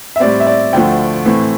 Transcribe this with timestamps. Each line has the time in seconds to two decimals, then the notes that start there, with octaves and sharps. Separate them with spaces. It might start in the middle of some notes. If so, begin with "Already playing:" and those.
0.16 E5
0.20 A2 G3 C4 D5
0.40 E5
0.47 D5
0.73 D2 D3 F3 A3 G5
1.25 A2 E3 A3 C4